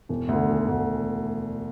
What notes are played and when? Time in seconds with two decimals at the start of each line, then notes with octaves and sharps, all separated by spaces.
0.09 E1
0.29 D2 D3
0.49 E1
0.68 D2 D3